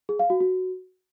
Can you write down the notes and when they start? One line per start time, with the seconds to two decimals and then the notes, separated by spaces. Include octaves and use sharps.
0.09 G#4
0.19 F5
0.30 F#4
0.40 F#4